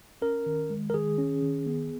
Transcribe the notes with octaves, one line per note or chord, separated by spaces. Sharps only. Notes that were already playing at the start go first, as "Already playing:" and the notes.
C#4 A#4
D#3
G#3
A#4
D#3 G#4
C#4
D#3
B3